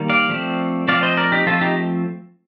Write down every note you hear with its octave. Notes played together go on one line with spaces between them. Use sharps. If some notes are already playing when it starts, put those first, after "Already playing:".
Already playing: D#3 G3 A#3
D5 F5
F3 A3 C4
F3 A3 C4 D5 F5
C5 D#5
A#4 D5
D#4 G4
F3 A3 C4 F4 A4
D#4 G4